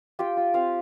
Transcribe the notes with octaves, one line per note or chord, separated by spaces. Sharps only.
F4 G4 G5
F4
C4 F4 F5